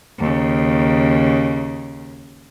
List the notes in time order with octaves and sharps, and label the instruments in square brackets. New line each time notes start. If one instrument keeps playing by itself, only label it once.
[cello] D#2 C#3